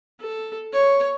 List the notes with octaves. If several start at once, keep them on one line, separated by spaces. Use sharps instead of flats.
A4
C#5